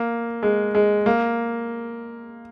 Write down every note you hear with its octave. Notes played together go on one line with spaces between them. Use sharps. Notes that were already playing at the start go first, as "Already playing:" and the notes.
Already playing: A#3
G#3
G#3
A#3